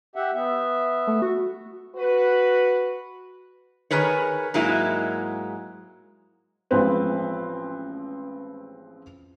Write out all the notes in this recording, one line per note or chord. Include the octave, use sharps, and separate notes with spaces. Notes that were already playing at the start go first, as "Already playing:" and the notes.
G4 E5 F#5
B3 E5
A3
F#4
F#4 B4
D#3 G#4 A#4 B4 C#5
G#2 F#3 G#3 A#3 E4
A1 F3 G#3 B3 C4 B4